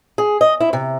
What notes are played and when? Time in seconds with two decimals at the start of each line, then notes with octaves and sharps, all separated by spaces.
0.18 G#4
0.41 D#5
0.60 E4
0.73 C3